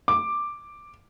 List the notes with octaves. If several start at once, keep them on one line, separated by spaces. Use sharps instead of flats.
D6